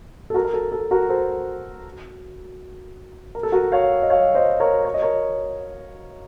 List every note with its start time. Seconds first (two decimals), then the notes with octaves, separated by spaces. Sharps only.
0.30 A4
0.34 F#4 A#4
0.45 A#4
0.54 A4
0.72 A4
0.91 F#4 A#4
1.10 A4 C5
3.35 A#4
3.43 A4
3.52 F#4 A#4
3.72 C#5 F5
4.03 D#5
4.10 C#5 F5
4.35 C5 D#5
4.60 A#4 C#5
4.85 C#5
4.94 D#5
5.02 A#4 C#5